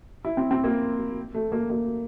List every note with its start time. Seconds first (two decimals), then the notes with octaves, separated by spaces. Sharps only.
0.25 E4
0.37 C4
0.51 C4
0.64 A#3
1.35 A3
1.52 A#3
1.70 A#3